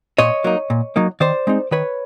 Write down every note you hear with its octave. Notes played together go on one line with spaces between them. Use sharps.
A#2 C#5 D#5
F#3 A#3 D#4
A#2
F#3 A#3 D#4
D#3 C5 D5
G#3 C4 D#4
D#3 B4 C#5